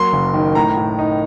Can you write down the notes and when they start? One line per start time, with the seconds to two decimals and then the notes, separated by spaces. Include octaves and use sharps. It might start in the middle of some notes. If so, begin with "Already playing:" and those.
Already playing: F#3 A#3 C6
0.13 F#1
0.34 D#3
0.55 A2 A#5
0.77 A2
0.99 D#4